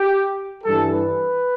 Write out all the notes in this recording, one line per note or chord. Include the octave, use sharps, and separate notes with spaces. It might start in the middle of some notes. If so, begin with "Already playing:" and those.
Already playing: G4
G2 E3 G3 A4
B4